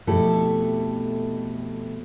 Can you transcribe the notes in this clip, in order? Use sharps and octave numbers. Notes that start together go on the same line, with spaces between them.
F2 B2 A3 E4 G4 A4